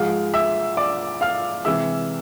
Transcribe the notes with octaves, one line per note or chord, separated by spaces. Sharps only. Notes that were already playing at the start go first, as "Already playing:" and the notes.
Already playing: G#2 F3 G#3 F5 F6
E5 E6
D5 D6
F5 F6
C3 E3 G#3 E5 E6